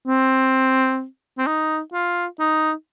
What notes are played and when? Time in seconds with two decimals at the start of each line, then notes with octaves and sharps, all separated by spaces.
0.07 C4
1.38 C4
1.47 D#4
1.93 F4
2.40 D#4